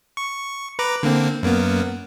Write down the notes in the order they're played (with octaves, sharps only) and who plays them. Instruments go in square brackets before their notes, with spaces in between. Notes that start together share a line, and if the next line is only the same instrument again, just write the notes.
[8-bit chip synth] C#6
B4 A#5 D6
D3 A#3 C4
F#2 A#3 B3